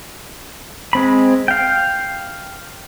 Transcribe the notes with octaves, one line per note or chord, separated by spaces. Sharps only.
G#3 C4 B5
F5 G5